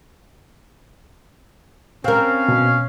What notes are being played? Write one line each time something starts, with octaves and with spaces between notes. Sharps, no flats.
C4 C#4 A#4 F5
B2